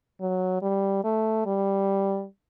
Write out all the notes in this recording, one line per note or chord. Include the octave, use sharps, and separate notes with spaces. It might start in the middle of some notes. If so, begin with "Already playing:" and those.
F#3
G3
A3
G3